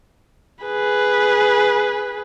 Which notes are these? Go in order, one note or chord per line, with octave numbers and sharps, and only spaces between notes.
G#4 B4